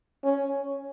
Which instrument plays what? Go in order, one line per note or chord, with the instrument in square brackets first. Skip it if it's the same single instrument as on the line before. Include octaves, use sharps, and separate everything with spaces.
[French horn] C#4